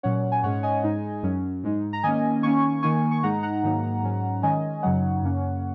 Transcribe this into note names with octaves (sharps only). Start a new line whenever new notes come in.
A#2 F#3 C#4 C#5 F#5
G#5
G#2 G#3 C#4 C#5 F#5
D#5 G#5
G#2 G#3 D#4
F#2 F#3 C#4
G#2 G#3 D#4
A#5
D#3 A#3 C#4 D#5 G#5
D#3 A#3 C#4 G#5 C#6
D#3 A#3 D#4 G#5 C#6
C#6
G#2 G#3 D#4 F#5 A#5
F#5 A#5
G#2 D#3 F#3 A#3 D#4
G#2 F#3 C#4
D#3 G#3 C#4 D#5 G#5
F#2 C#3 F#3 D#4 C#5 F#5
F#2 C#3 A#3 C#4